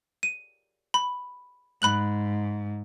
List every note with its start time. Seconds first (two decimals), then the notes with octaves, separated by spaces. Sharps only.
0.23 D#7
0.94 B5
1.82 G#2 B5 F#6 F#7